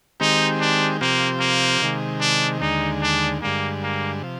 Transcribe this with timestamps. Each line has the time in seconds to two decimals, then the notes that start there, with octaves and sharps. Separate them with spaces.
0.20 D#3 G#3 C4 D#4 G4
0.61 D4
1.01 C3 F3 A#3 C4 G4
1.40 A#3
1.81 C3 D#3 G#3
2.21 D4
2.61 D#2 D3 G#3 D#4
3.02 D4
3.42 G2 D3 G#3 A#3
3.83 A#3
4.22 C3 F3